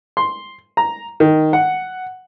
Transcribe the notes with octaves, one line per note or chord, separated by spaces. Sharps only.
C6
A#5
D#3
F#5